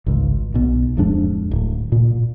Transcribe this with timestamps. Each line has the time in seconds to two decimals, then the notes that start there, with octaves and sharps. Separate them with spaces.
0.06 G#1 C#2
0.54 B1 B2
0.97 D1 F2 G#3 D4
1.51 D1
1.92 A#2